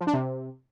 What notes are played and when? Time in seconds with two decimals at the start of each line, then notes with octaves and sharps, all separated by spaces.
0.01 F3
0.07 D4
0.13 C3